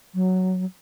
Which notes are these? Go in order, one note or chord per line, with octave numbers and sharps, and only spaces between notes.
F#3